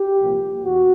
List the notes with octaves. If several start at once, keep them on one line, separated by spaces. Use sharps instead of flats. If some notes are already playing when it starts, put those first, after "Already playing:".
Already playing: G4
C2 A#2 F3 A#3
E2 F#4